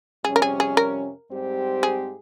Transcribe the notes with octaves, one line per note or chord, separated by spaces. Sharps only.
F2 C3 G3 C#4 G#4
A#4
G#4
G#4
A#4
G#2 G3 C4 G4 C5
G#4